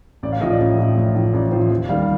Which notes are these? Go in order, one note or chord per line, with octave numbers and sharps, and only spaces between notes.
A1 D5
F5
A2 F3 D#5
D5
A1
A2 F3
A1
A2 F3
A1 D5
A2 F3 C5
D#2
D#3 G3 F5